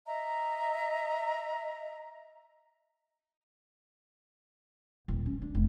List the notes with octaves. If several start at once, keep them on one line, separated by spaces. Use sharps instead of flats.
D#5 E5 A#5
D#1
C#4
D4
F1